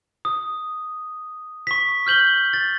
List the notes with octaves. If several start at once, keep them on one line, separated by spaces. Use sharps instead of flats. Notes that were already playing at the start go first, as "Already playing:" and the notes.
D#6
C#6 B6
F6 G6 F#7 G7
A6